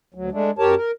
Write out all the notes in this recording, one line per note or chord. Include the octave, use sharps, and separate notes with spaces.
D2 F#3
G#3 A3 D4
F#2 G4 A#4 C#5 A5
A#4